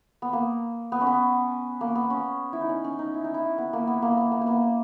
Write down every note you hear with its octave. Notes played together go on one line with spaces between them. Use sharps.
B3
A#3
B3
C#4
B3
A#3
B3
C#4
E4
D#4
C#4
C#4
D#4
E4
D#4
E4
B3
A#3
B3
A#3
B3
A#3
B3
A#3